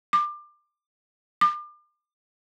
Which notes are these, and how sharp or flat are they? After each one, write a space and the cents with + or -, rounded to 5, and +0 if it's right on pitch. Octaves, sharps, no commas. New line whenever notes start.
D6 +25
D6 +35